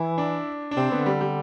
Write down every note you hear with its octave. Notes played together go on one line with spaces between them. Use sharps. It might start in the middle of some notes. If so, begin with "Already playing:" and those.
Already playing: E3 E4
D4
D4
C3 C4
D3 B3
G3
G3